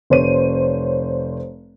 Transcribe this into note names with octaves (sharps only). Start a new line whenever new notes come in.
F1 C5 C#5 D#7